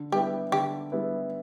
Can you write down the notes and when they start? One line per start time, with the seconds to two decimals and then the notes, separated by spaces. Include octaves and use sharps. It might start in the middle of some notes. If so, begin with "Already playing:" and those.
Already playing: D3
0.12 G3 B3 E4 G4
0.52 D3 G4
0.92 G3 B3 E4